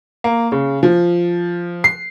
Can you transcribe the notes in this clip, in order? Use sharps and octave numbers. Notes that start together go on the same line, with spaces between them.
A#3
C#3
F3
C7